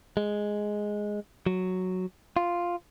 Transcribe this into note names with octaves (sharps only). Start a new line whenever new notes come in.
G#3
F#3
F4